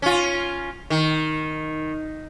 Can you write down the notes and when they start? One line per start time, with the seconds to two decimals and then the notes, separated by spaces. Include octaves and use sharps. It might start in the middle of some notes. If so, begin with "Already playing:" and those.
0.02 C#4 F4
0.90 D#3